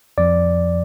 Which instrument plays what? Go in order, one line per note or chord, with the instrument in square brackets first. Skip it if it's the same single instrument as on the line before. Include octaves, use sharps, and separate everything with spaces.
[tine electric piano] F2 F3 D5